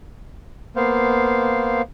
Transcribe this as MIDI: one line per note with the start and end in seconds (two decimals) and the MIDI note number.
0.76 1.82 58
0.76 1.82 59
0.76 1.82 72
0.76 1.82 77